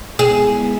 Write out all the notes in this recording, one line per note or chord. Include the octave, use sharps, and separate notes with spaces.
G#3 B3 E4 G#4 B4 E5